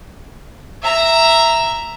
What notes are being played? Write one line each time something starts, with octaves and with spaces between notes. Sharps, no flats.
E5 A#5